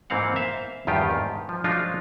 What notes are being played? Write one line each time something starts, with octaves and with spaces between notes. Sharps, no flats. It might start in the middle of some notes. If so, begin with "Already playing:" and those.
G#2 E3 A#3 C4 F5 F#5
C5 E5 F5
E2 G2 D#3 F4 G4
G#2
F3
F3 F#3 G#3 D4 D#4 F4